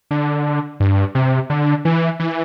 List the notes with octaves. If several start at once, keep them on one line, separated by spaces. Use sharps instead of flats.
D3
G2
C3
D3
E3
E3